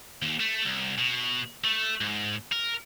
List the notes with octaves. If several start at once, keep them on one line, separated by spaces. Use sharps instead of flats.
D#2
A3
C2
B2
A3
G#2
A#4